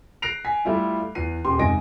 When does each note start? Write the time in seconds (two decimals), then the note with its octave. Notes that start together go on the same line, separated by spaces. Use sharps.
0.22 F#6 A#6 C7 D7 F7
0.45 G#5 B6
0.65 G3 A3 E4 F4
1.15 E2 C7 D#7
1.45 D#1 G4 C6
1.59 F1 G#2 D#5 G#5 A#6 D7